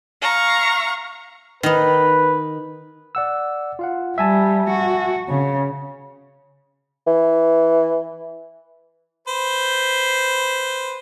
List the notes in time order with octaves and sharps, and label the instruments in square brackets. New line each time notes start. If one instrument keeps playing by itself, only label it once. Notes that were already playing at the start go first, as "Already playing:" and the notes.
[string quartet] F5 A#5 C#6
[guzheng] D#3 D#4 [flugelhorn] B4
[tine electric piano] D5 F#5 E6
F4 F5 F#5
[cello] G3 [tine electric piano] E5 G#5 A5
[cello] F#4
C#3
[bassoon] E3
[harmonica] B4 C5